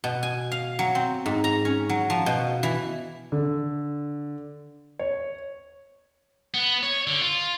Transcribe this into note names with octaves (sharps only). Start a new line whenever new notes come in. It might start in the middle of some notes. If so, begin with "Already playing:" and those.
B2
G#5
F5
F#3
C4
G#2
A#5
C#4
F#3
F3
B2
E3
D3
C#5
B3
C#5
D3
F4